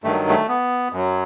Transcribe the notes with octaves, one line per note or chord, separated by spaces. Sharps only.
G2 D#3 F#3 A3
A3
B3
F#2 F#3